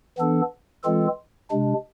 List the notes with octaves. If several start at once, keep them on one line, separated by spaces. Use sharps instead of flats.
E3 B3 D4 A4
E3 G#3 C4 F4 A4
C3 G#3 D4